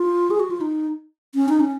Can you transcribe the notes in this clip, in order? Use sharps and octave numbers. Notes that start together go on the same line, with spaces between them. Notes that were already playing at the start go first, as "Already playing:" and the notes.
Already playing: F4
G#4
F#4
F4
D#4
C#4
D#4
C#4